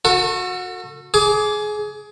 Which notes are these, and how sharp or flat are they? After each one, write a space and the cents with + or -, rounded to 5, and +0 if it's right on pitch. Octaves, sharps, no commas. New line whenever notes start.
F#4 -25 A4 +30
G#4 +20 D6 -10